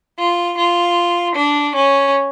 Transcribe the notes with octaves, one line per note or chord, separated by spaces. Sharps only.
F4
F4
D4
C#4